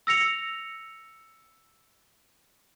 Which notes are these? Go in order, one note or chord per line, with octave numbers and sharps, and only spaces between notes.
E6 A#6 C#7 F7